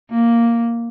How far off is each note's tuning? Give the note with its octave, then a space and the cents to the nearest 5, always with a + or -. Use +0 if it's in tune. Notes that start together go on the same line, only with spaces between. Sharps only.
A#3 +0